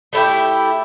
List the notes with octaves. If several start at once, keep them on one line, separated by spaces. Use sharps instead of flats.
A3 E4 G4